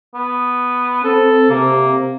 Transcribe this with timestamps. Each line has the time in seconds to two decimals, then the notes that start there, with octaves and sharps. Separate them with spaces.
0.14 B3
1.04 C4 A4
1.50 C3 A#3